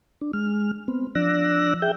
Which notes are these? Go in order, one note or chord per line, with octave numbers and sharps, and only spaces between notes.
D4
G#3 F6
B3 C4
F3 D4 D5 E6 F#6 A#6
G#4 E5 G5 G6